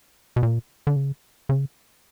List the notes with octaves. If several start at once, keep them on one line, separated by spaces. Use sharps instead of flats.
B2
A#2
D3
C#3
C#3